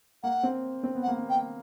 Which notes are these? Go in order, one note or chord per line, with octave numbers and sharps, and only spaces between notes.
A#3 F#5
C4
C4
B3
F#5
A#3
B3
G5